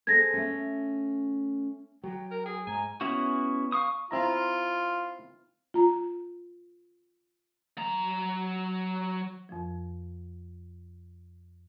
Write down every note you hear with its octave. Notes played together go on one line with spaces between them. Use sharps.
G#4 A4 C5 G#6 A#6
A3 C#4
F#3 G5
A#4
G#4
G#2 G#5 A#5
B3 C#4 E4 F#4
F5 C#6 D#6
C4 E4 F4 A#5
F4 A#5
F#3 A#5
F2 F3